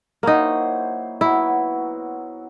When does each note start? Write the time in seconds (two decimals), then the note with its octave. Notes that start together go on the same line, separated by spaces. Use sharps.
0.23 F#3 A#3 D#4 E4 C5
1.21 B2 F#3 E4